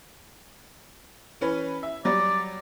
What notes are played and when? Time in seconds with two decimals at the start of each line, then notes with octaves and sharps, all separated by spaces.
1.41 E3 C#4 B4
1.83 E5
2.05 F#3 G3 D5